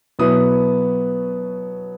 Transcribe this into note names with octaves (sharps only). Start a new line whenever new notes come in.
B2 F#3 B3 E4 D#6